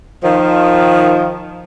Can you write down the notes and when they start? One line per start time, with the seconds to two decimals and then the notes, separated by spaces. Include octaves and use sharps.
0.24 D#3 F3